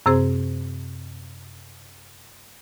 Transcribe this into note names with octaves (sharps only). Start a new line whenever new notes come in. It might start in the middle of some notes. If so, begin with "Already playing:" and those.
F#2 C3 C4 G#4 C5